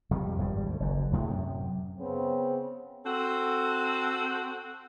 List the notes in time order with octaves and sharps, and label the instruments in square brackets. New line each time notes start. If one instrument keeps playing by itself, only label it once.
[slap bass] F2 C3 G3
G#1 G2 C#3 G3
D2
F#1 F#2
D2 A2 G#3
F#2 C3
[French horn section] C#3 B3 C4
[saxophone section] C4 F#4 A4